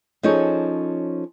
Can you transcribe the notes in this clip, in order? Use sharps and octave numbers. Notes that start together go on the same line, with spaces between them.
F3 C#4 D#4 G#4 A4 C#5